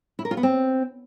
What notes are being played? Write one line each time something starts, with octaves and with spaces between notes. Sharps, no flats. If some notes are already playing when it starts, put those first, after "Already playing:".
E4
A#4
F4
B3
C4